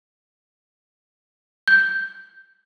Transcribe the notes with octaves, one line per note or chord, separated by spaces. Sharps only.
G6